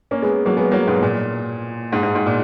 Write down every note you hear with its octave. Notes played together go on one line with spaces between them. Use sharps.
A#3 C#4
G#3 B3
F#3 A#3
G#3 B3
F#3 A#3
G#2 B2
A#2
G#2
G#2
G#2
A#2